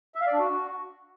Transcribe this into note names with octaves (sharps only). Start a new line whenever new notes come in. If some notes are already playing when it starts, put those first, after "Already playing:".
E5
F5
D5
D4
F#4